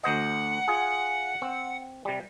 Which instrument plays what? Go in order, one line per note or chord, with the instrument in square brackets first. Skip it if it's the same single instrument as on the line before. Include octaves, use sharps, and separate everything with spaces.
[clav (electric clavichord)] D2 C5 D#5 [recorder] F#5
[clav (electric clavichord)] F4 G#4
C4
C3 G3